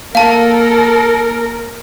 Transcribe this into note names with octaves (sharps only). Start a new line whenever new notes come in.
A#3 A4 A#4 F5 A5